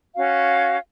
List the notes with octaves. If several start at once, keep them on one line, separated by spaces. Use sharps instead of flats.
C#4 F#4 F5